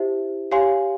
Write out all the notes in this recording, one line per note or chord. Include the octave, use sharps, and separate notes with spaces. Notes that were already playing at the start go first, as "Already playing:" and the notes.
Already playing: E4 G4 C5 E5
G4 C#5 F5 G#5 C6